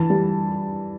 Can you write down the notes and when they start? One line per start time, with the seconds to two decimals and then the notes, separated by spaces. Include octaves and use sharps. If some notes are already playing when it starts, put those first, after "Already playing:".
Already playing: E3 A5
0.10 G3